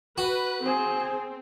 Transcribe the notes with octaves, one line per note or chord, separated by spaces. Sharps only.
F#4 B4
C4 G#4 C5